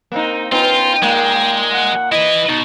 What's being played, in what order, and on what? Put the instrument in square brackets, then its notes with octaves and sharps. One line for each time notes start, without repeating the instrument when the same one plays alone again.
[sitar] A#3 C4 D#4
[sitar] B3 C#4 D#4 [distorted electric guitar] F4 [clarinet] G5
[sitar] A#2 A#3 [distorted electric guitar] G#3
[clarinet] F#5
[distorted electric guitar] E4 B4 [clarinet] D#5
[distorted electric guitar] B2 [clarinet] D#4